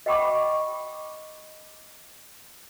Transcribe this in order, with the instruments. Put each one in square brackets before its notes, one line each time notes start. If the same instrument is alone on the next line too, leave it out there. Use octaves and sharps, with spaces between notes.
[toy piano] D#5 F#5 G5 B5 C#6 D6